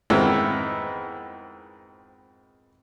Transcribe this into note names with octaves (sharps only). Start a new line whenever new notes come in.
F2 G#2 D#3 G#3 B3 E4